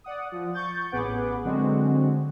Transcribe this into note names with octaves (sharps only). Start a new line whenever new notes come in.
D5 F#5 D#6
F3
C#6 G6 A6
A1 B3 G#4 B4 F#5 D6
D3 F#3 G#3 C4 F#4